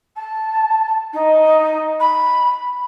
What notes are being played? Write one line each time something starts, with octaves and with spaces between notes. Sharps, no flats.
A5
D#4
B5